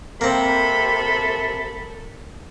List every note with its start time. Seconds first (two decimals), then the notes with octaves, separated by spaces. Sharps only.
0.21 C3 A#3 C4 A4 A#4 B5